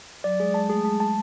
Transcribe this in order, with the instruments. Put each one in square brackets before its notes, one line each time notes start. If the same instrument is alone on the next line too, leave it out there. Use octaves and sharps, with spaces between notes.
[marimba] F#3 [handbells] D5
[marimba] G#3 [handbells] G#4
[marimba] G#3 [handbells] A5
[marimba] A3 [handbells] G#4
[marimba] G#3 [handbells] A5
[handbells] A5